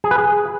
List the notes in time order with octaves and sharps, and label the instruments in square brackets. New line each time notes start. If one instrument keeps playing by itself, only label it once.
[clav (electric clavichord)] G#4
B4
G#4